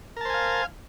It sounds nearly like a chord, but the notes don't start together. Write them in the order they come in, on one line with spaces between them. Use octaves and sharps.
A#4 A5 C5 G#5 F5